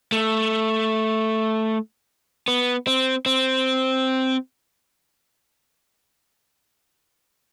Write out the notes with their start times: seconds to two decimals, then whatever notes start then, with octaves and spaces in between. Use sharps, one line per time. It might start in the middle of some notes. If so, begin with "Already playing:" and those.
0.12 A3
2.48 B3
2.87 C4
3.26 C4